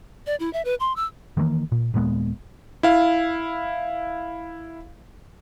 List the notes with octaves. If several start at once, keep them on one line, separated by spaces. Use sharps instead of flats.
D5
E4
E5
B4
C6
E6
D#3 E3 G#3 A#3
A#2
D#1 A#2 G#3 B3
E4 F5